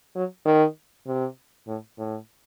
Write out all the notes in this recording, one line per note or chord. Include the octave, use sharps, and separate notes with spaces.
F#3
D#3
C3
A2
A2